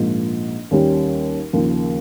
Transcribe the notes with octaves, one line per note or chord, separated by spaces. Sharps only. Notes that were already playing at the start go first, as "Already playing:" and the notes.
Already playing: A#1 G#2 F3 A#3
D#2 D#3 G3 C#4 G4
D#2 C#3 F3 A#3